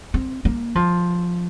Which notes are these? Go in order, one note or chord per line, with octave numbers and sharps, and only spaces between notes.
C4
A#3
F3